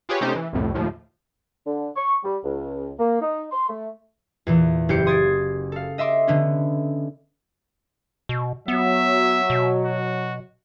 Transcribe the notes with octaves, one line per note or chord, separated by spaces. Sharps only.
F4 G4 G#4 B4 C#5
C3 A3 C#4 D#4 G4 C5
E3
C2 F2 A2
D#2 A2 F3
D3
C#6
G3
C#2
A#3
D#4
C6
A3
E2 A#2 E3
F#1 E4 G4 C5 G6 C#7
C6 D#6 G#6 A6 C7 D7
A4 F5
D#5 E5 C6 D6
D3 B3 C#4
B2
F#3 B3 E5
B2
F#4